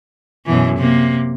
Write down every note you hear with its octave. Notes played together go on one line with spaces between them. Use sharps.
F#2 B2 E3
C3 A#3